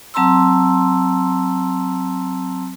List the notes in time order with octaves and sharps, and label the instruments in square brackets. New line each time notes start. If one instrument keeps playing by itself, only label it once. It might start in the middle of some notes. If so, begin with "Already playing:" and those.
[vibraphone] F#3 C4 A5 A#5 C6 E6